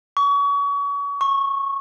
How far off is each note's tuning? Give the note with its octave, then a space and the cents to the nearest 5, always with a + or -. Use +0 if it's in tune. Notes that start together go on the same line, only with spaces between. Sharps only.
C#6 +35
C#6 -15